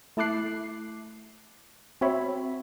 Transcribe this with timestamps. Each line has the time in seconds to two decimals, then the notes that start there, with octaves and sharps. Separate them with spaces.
0.17 A3 E4 A5 D6 F#6 C7
2.01 C4 F#4 C#5 E5 B5